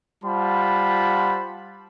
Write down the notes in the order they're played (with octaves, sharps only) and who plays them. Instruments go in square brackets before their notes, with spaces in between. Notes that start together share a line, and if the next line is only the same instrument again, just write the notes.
[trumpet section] G3 F4 C5 F#5 A5 B5